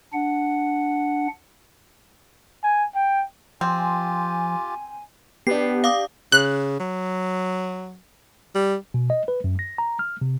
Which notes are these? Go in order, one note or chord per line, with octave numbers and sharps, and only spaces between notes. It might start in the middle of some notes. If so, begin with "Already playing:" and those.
D4 F#5
G#5
G5
F3 C4 F4 G4 G#5
B3 D4 G4 C7
F5 D6 D#6
C#3 F#6
F#3
G3
B2
D#5
B4
F#2
A#6
A#5
F6
C3